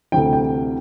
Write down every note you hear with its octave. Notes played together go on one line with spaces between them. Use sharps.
D2 C3 E3 G5
G5